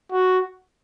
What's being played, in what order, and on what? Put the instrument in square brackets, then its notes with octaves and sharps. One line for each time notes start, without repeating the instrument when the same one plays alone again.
[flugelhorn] F#4